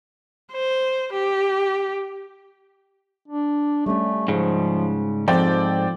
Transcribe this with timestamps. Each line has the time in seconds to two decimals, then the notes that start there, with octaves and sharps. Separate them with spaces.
0.52 C5
1.13 G4
3.28 D4
3.86 G3 A3 C#4
4.28 G#2 C#3 F3 G#4
5.28 G#2 F3 C4 A4 D5 G5